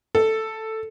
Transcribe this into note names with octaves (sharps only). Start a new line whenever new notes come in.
A4